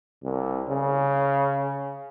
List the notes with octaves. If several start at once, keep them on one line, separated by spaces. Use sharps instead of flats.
C2
C#3